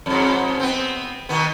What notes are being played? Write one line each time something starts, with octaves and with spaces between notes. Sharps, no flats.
F2 G#2
B3 C4
B2 D#3 B3